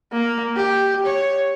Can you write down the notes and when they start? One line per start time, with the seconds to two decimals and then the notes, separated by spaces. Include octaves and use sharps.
0.13 A#3
0.56 G4
1.06 C#5